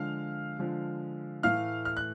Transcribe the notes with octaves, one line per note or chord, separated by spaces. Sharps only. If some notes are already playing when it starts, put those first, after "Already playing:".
Already playing: D3 F3 G#3 F5 F6
D3 F3 G#3
A2 E3 A3 F5 F6
F6
F#6